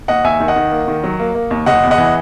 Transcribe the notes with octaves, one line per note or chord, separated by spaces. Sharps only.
D#2 D#5 F#5
D#2 E5 G#5
D#3
D#5 F#5
D#3
A#3
D#3
F#3
A#3
A#3
D#2
F#1 D#5 F#5
E2
D#5 F#5
E3